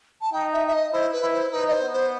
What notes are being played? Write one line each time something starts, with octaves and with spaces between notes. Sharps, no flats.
A5
D#4 G5
E5
E5
D#5
E4 C5
B4
E4
C5
D#4 B4
D#5
C5
B3
C5